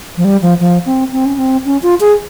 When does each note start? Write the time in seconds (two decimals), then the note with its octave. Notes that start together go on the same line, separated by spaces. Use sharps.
0.17 F3
0.25 G3
0.42 F3
0.60 F3
0.86 C4
1.12 C4
1.26 C#4
1.39 C4
1.65 C#4
1.83 F4
2.00 G#4